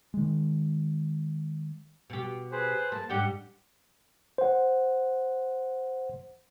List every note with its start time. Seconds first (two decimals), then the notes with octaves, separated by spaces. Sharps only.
0.14 D#3 G#3
2.10 B2 G4
2.52 G#4 B4 C5
2.92 A#3 A5
3.10 G#2 G3 D4 G4 F#5 G6
4.38 C5 F#5